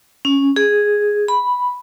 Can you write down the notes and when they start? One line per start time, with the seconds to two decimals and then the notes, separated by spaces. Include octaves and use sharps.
0.25 C#4
0.56 G#4
1.28 B5